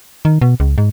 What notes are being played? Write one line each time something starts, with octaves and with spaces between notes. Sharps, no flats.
D#3
B2
C#2
G#2